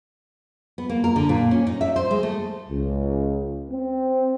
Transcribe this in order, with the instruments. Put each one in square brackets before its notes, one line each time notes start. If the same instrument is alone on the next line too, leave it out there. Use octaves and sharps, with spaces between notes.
[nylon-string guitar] B3
A#3
A#4
D3
A#2
C#4
D#4
E5
C5
G#3
A3
[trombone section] C#2
C4